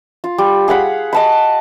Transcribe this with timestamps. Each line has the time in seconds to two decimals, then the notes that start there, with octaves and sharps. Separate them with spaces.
0.24 F4
0.38 G3
0.68 G#4 F5 F#5 B5
1.13 D#5 A5 B5